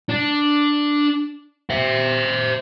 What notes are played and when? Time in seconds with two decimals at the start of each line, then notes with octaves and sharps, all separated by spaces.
0.10 D4
1.70 C5 E5